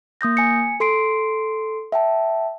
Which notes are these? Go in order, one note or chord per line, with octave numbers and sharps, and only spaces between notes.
A#3 D#6 G6 A#6
G#5 C#7
A4 C6 C7 D7
E5 G5 A5